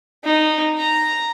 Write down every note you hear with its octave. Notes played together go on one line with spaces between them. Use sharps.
D#4
A#5